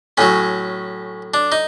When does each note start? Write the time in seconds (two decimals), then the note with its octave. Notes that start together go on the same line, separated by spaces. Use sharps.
0.18 A2 F#3 C#4
1.34 D4
1.52 D#4